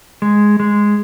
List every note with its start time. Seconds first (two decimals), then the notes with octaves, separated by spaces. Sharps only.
0.22 G#3
0.60 G#3